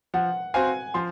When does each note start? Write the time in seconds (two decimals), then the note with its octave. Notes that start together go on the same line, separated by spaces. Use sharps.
0.14 F3 F#5
0.54 C4 F#4 C5 F5 G#5
0.94 F3 C6